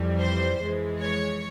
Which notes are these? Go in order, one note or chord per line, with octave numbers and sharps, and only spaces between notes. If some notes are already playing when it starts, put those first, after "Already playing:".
Already playing: F2 E3 G3
C5
F2 E3 G#3
C#5